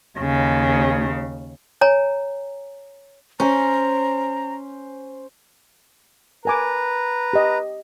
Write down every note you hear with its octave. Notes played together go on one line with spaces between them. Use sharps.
D#2 C#3
C#5 G#5 A#5
C#4 C5 G#5 A#5
A#4 B4 G#5 A#5 D6
G4 D#5